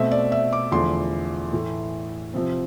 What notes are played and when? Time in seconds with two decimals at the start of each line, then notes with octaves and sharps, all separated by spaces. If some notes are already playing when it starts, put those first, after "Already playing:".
Already playing: B2 A3 C4 E5
0.11 D5
0.32 E5
0.53 D6
0.72 E2 D3 F3 A3 C6
1.53 A2 E3 A3
2.34 C3 F3 C4